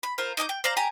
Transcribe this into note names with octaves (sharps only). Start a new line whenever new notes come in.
B5
F4 A#4 C5
D#4 D#5 G5 D6
G5
C5 D5 F5 A#5
G4 G#5 A#5